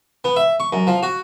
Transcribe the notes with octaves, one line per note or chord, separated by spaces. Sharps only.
B3
E5
C#6
F#2
F3
F#4